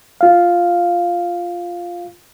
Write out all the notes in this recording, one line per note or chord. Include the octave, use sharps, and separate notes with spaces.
F4 F5